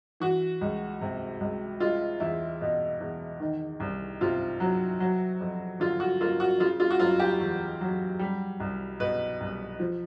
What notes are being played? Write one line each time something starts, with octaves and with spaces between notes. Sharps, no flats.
E3 F#4
C#2
C3
C#2
G#3 F4
E2 E4
B2
E2
D#3
C2
C3 F4
F#3
F#3
F2
D3 F4
F#4
A#3 F4
F#4
C#3 F4
F4
F#4
F#1 F4
G4
E2
F#3
G3
C2
B2 B4
C2
F3